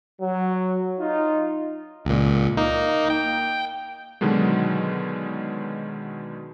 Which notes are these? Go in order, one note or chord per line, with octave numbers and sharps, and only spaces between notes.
F#3
D#4 F4
C#2 A#2
A#3 D#4
G5
B2 D3 D#3 F#3 G#3